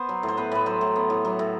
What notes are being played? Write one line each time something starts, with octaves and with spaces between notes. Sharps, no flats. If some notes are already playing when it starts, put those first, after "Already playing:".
Already playing: B3 C5
F#3
A2
C5
B3 B4
A2 B4
F#3 C5
A2
B3
A2
F#3
A2